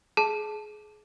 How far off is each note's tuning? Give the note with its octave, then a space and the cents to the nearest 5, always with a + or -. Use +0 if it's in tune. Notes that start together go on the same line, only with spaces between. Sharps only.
G#4 +25 A5 +0